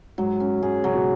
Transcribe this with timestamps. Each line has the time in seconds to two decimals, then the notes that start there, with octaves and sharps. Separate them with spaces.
0.18 G#2 F#3
0.40 C#4
0.62 G#2 G#4
0.83 C#3 F#3
0.94 B2